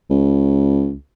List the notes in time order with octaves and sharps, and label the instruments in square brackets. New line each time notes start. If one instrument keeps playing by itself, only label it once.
[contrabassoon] C#2